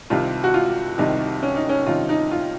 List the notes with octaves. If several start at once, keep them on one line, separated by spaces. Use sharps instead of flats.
C2 C3 D#3 F4
F#4
F4
C2 C3 D#3 D#4
C#4
D#4
C#4
C2 C3 D#3 F4
D#4
F4